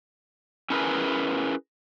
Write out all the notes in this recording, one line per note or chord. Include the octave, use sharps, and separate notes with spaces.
C#4 E4 G#4 A#4 B4